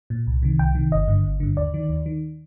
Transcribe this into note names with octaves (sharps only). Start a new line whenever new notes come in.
A#2
C2
C3 D#3
C2 G5
C3 D#3
G1 D#5
G2 D3
G1
G2 D3
D#2 D5
D#3
D#2
D#3